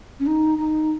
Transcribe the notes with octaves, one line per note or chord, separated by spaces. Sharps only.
C#4
D#4
D#4